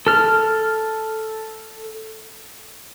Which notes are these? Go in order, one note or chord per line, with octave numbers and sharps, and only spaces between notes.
A4 F6